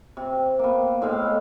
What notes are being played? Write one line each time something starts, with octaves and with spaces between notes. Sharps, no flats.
C3
A#3 B3
A2 G#3 F5